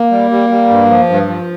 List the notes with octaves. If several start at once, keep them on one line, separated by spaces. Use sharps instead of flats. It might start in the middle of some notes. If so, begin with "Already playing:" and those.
Already playing: A#3
G3
G3
G3
G2
F3
G2
F3